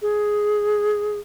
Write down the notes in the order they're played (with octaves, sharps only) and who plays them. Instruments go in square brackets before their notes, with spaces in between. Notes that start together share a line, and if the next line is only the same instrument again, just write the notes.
[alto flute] G#4